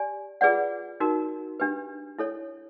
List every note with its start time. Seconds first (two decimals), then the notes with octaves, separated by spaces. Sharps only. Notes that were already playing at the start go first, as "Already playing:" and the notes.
Already playing: G4 D5 G#5
0.41 F4 G#4 B4 D5 F#5
1.00 D#4 F#4 A#4
1.60 D4 G4 B4
2.19 E4 A4 C#5